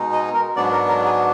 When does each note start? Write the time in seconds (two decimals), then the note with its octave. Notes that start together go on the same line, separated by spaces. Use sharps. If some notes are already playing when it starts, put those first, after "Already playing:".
Already playing: B2 G#3 D#4
0.13 D#5
0.34 A#4
0.56 G#2 F#3 B3 D4 D5
0.72 A#4
0.88 A#4
1.06 G#4